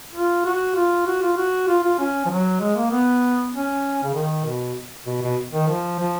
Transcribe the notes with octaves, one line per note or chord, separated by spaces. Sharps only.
F4
F#4
F4
F#4
F4
F#4
F4
F4
C#4
F3
F#3
G#3
A#3
B3
C#4
C#3
D#3
B2
B2
B2
D#3
F3
F3